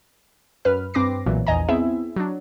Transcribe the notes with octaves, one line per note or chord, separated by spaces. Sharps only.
F#2 B4 F6
G2 C4 B4 D6 A#6 C7
B1 A#2 E3 F#3
A#1 E2 D#5 G#5 A#5
B3 C4 E4 G#4 E5
F#3 D4